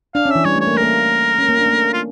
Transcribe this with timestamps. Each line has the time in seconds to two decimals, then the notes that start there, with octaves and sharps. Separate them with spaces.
0.15 D4 F5
0.26 C#4
0.30 E5
0.35 E3
0.45 G3 C#5
0.56 A3
0.61 C#5
0.67 A#3
0.74 A3
0.77 A#4
0.83 A#3
1.39 C#4
1.49 A#3
1.59 D4
1.66 A3
1.69 A#3
1.93 F4